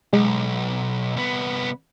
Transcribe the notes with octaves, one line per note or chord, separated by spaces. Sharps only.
B1 G#3
C2 B3